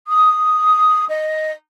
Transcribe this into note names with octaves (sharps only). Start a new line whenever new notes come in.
D#6
D#5